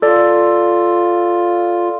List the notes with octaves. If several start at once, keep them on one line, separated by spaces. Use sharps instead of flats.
F4 A4 D5